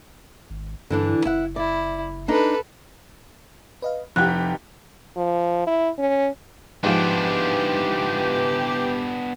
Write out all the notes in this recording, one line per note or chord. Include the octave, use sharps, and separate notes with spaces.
G#1
G2 D3 E3 D4
F#1 E4 F#5
E4 D5
D4 D#4 A4 B4
B4 D#5 F5
F1 F2 E4 F4 G4 F#5 F#6
F3
E4
C#4
G#2 E3 F3 B3 D4 G4